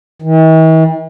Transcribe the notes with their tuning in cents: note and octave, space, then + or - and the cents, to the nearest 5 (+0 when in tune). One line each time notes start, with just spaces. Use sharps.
E3 -45